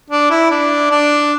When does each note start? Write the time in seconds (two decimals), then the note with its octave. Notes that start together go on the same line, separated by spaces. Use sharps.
0.10 D4
0.30 E4
0.50 D4
0.91 D4